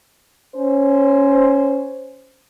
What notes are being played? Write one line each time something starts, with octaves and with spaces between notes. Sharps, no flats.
C#4 C5